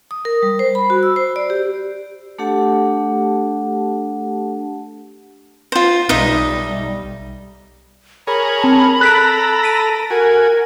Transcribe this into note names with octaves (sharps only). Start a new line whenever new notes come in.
D#6
A#4
G3
C5
B5
F#4
E6
C5
D5
G4
A3 D4 G4 A4 F#5 A5
F4 C5
B1 G3 D#4 D#5 E5
G#4 A#4 C#5 B5
C4 A5
A4 A#5 F#6 B6 D7
B6 D7 D#7
F#4 A#4 G#5